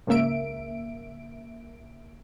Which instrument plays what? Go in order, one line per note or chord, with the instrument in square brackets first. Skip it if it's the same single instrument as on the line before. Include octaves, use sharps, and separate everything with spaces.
[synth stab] G#1 C#2 C#3 A#3 E5 D7